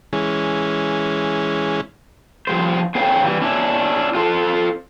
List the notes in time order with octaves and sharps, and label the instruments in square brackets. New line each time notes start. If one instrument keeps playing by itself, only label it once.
[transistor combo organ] E3 G#3 C#4
[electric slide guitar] F3 G3 C5
C4 G#4 C5 C#5 F5 G5
E3 G3
C#4 D4 E4
F4 A4 C5